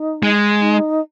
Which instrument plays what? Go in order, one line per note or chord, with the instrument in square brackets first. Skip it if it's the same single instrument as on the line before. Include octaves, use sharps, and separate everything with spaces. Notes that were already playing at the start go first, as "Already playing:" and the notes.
Already playing: [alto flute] D#4
[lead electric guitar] G#3
[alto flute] D#4